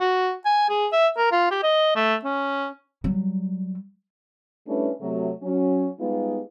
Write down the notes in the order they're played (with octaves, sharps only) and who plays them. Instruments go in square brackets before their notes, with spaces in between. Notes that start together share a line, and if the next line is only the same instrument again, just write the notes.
[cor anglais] F#4
G#5
G#4
E5
A#4
F4
G4
D#5
A3
C#4
[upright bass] F#3 G3
[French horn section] G3 A3 C#4 D4 E4 B4
C3 F#3 A3
F#3 C#4
G3 G#3 B3 D#4 F4 G4